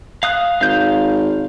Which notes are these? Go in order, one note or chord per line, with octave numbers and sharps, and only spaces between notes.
F5 D#6 F#6
G#1 F5 G6